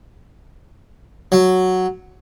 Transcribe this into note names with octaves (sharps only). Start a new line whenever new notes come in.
F#3